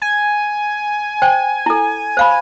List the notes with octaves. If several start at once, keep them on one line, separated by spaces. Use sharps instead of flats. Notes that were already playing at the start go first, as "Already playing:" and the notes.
G#5
C5 G5
E4 A4
C5 F5 B5